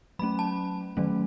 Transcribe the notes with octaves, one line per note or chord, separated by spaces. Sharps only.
F#3 A3 C#4 B5
A5
D#3 F#3 A3 C#4